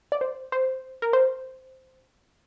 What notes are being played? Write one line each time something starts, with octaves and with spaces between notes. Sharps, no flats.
D5
C5
C5
A#4
C5